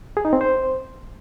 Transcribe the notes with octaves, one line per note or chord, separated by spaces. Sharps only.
G#4
D#4
C4
C5